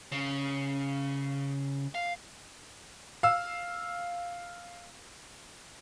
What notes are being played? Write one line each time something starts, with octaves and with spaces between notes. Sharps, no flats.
C#3
F5
F5 E6